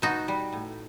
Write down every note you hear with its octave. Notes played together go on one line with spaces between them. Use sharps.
B2 D#4 F#4
G3
A2